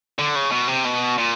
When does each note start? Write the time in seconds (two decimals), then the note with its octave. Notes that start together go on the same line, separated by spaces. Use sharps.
0.19 D3
0.36 C#3
0.52 B2
0.68 C3
0.85 B2
1.18 A#2